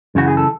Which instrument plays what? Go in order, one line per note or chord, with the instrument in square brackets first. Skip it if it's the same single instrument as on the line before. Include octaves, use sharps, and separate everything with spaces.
[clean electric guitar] F#2 C#3 E3 F#4
G#4
A4